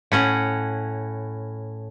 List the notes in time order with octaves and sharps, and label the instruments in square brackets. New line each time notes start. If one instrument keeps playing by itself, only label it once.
[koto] A2 C#4 F#5